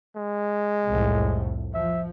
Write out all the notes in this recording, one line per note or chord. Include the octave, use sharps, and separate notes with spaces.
G#3
C2 F2 A2
F3 E5